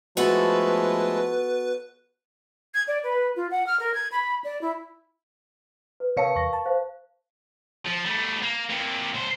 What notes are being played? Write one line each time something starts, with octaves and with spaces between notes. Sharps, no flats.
F3 G#3 A3 B3 E4 F#4 A4 B4
G#6
D5
B4
F4
F#5
F6
A#4
G#6
B5
D5
E4
B4
C3 A#4 C#5 F5 A5 C#7
E2 C#6 A#6
A5
C5 F5
F3
G3 A3
A#3
C3 A#3
C#2 C5